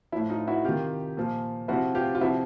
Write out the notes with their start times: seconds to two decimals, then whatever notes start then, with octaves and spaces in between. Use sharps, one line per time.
0.12 F3 E4
0.16 A2
0.30 D#4 F4
0.48 E4 F#4
0.64 C3 D#3 F4 G4
1.17 A#2 F3
1.68 C3 F3 E4 F#4
1.95 F4 G4
2.15 F4
2.21 C3 F3 E4 F#4